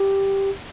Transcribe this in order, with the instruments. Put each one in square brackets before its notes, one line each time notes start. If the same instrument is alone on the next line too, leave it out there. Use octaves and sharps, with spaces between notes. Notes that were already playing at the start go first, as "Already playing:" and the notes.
Already playing: [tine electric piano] G4